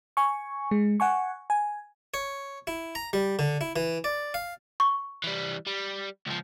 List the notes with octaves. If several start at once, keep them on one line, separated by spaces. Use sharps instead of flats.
G#5 C#6
G#3
F#5 G#5 C#6
G#5
C#5
E4
A#5
G3
D3
E4
E3
D5
F5
C#6
E3 G3
G3
C#2 F3